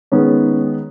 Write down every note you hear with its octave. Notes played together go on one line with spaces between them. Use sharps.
D#3 G#3 B3 C#4